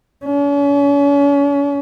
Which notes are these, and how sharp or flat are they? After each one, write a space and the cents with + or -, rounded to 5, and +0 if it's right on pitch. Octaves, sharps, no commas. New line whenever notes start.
C#4 +40